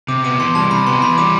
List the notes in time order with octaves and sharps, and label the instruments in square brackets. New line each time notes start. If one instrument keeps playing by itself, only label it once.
[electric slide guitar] C3 [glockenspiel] D6
[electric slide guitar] B3 [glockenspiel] D6
[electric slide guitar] E3 [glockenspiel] C6
[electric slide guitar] G3 [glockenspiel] A5
[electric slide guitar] C3 [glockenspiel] B5
[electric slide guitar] B3 [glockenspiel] C6
[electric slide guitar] E3 [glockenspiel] B5
[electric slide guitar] G3 [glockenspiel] D6